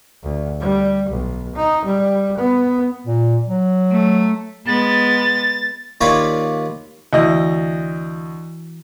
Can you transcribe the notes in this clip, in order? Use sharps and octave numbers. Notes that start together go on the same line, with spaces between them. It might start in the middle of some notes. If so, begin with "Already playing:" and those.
D2
G3
B1
D#4
G3
B3
A#2
F#3
A3
G#3 B3 A6
D#2 F4 C#5 D5 B5
D2 E3 E4 F#4 D#5